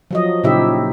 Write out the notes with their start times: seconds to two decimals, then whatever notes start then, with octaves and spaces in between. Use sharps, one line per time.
0.11 F3 F#3 D#5
0.43 A#2 C#3 D#4 E4 G4 E5